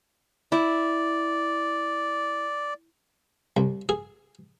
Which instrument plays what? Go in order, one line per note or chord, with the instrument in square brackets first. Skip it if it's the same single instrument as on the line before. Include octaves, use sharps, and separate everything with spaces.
[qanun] E4 [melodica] D5
[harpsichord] C2
G#4